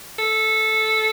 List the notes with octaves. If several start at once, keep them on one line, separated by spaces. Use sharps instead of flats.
A4